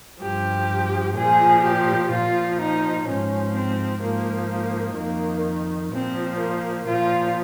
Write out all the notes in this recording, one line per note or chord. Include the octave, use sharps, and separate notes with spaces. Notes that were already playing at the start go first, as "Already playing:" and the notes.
G2 F3 G4
A#2 F3 G#4
G4
A#2 F3 F4
D#4
G#2 F3 C#4
C4
G#2 F3 A#3
A#3
F2 D#3 A#3
A#2 F3 C4
A#3
A#2 F3 F4